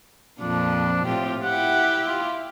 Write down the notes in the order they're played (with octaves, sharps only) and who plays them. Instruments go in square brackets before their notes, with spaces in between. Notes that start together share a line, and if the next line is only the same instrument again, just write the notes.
[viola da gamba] F2 A#2 F3 [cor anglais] D4
[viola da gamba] A2 C4 F4 [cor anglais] G4
[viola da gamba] E4 G4 [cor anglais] F#5
[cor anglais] F4